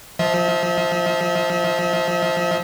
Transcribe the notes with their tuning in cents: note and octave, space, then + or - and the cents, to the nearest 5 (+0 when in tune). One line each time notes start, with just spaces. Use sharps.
F3 +0 E5 -40